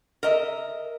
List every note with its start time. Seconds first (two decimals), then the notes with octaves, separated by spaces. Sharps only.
0.23 A#4 D#5 E5